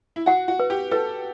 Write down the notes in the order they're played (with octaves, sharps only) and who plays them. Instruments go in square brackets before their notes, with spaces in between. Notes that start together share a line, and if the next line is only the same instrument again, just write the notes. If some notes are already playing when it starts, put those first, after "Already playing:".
[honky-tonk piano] E4
[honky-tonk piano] F#4 [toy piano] F#5
[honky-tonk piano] F#4
[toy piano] B4
[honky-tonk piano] G4
[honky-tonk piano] A4 [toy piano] B4